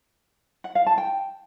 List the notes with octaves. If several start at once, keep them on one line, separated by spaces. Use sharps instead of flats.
F#5
F5
A5
G5